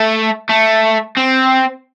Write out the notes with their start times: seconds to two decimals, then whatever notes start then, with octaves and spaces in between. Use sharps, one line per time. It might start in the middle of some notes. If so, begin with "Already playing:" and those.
Already playing: A3
0.49 A3
1.17 C4